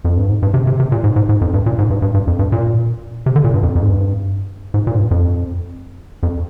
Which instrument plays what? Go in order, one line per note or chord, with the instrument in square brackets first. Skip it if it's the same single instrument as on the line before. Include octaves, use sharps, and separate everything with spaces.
[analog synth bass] F2
G2
G#2
G2
C3
C3
C3
A#2
G#2
G#2
G#2
F2
G2
A#2
G#2
G2
G2
G2
F2
G2
A#2
C3
D3
A#2
G2
F2
F2
G#2
G2
G#2
A#2
G#2
G2
F2
F2